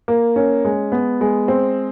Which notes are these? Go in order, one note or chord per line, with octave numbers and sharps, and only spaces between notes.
A#3
C#4
G#3
B3
G#3
C4